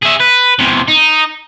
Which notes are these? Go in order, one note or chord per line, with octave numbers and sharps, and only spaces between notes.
G#4 E5
B4
E2 C3
D#4